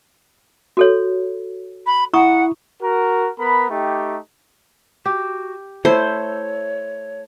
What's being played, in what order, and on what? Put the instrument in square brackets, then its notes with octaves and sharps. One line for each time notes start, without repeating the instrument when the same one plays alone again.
[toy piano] F#4 A4 C#5
[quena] B5
[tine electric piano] E4 [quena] F#5 [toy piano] A#5 C#6 D#6
[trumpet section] F#4 A#4
B3 A#4 B5
A3 D#4 G4
[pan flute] F#4 [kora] G4
[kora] A3 E4 [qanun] C5 [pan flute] C#5